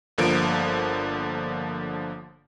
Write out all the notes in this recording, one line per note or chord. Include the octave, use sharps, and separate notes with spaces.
G1 D3 F3 A#3 D7